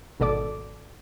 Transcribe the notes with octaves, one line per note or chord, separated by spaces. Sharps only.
G#1 B2 A4 D5 D6